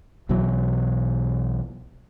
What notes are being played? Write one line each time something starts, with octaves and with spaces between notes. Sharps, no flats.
B1 B2 E3 F#3